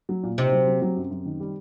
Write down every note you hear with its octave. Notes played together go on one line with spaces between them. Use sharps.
F#3
A#2
C3 D#4
F#3
F#3
F#3
F#2
F#2
D#3
G3